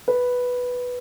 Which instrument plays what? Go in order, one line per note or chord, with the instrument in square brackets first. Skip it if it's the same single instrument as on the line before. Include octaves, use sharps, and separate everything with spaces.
[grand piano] B4